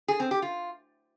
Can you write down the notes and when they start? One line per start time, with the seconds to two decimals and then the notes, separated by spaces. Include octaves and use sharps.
0.08 G#4
0.20 C4
0.31 G4
0.42 F4